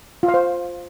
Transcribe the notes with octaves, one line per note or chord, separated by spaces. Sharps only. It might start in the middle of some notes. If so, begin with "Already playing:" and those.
F4
F5
C5